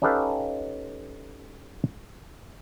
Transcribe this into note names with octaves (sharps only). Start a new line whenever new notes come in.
C#4 D#4 G4 A4 B4 F5